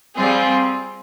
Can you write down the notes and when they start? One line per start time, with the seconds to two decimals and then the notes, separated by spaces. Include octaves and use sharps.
0.16 G3 C4 F4 G#4